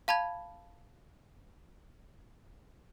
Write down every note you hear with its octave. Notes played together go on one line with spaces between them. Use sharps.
F5 A5 B5 G#6